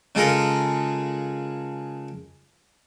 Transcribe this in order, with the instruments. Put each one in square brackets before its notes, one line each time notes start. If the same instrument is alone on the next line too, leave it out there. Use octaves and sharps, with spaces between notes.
[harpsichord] C#3 G#3 F4 A4 A#4